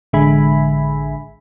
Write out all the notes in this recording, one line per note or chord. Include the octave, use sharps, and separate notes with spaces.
A1 D3 G#3 E5 G#5 B5